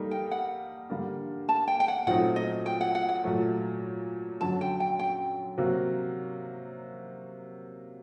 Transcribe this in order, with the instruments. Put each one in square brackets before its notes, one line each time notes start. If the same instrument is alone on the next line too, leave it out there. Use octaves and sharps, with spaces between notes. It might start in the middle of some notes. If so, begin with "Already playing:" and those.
Already playing: [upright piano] G3 A#3 D#4 A4
[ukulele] G5
F#5
[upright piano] D3 G3 A#3 D4
[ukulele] A5
G5
G5
F#5
[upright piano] A#2 F#3 A3 C4 D#4 [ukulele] F#5
[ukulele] D#5
G5
F#5
F#5
F#5
[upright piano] A#2 F#3 A3
[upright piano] F#2 D3 F#3 [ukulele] A5
[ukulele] G5
G5
G5
[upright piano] C3 F#3 A#3 F#4